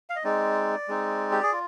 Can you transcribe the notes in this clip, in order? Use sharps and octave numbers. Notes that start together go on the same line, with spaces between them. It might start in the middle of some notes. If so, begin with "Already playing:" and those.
F5
D#5
G#3 C4 D#4 D5
G#3 C4 D#4
G4
G#4
F4